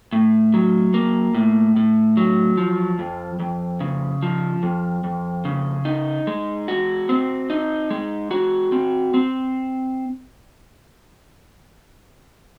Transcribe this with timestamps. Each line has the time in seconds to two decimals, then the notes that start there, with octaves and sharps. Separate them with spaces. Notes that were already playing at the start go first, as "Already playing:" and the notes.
0.13 A2
0.54 F#3
0.94 A#3
1.34 A2
1.76 A2
2.17 F#3
2.57 F3
2.99 F2
3.40 F2
3.80 C#3
4.22 F3
4.63 F2
5.04 F2
5.45 C#3
5.85 D#4
6.27 G#3
6.68 F#4
7.09 C4
7.50 D#4
7.90 G#3
8.31 F#4
8.72 C4
9.14 C4